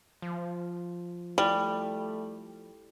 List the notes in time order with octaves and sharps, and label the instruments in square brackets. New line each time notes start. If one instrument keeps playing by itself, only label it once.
[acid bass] F3
[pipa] G3 [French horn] A3 [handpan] E4 G4